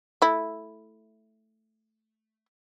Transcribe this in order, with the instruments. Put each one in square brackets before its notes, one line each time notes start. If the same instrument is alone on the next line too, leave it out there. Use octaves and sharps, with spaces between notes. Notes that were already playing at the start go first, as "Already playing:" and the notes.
[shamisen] A3 E4